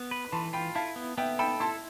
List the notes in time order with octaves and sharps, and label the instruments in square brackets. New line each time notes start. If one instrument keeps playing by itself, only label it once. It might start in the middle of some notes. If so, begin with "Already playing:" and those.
Already playing: [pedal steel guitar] B3
B4
[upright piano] B5
[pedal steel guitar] E3 [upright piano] A5 C6
[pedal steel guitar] F4 [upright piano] G5 B5
[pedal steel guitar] E4 [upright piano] F5 A5
[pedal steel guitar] B3
[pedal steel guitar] B3 [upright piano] E5 G5
[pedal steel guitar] A4 [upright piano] G5 B5
[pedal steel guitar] E4 [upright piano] A5 C6